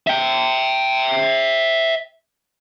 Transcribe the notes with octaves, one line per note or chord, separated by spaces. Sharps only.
E5 G5